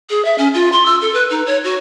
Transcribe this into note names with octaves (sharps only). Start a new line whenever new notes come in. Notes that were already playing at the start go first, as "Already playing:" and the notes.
G#4
E5
C#4
F4
C6
E6
A4
B4
D#4
C#5
F#4